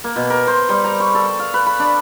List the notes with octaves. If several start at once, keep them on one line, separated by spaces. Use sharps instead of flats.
A#3
B2
A#4
C5
G3
A#5
C#6
A4
F5
B4
B5
D4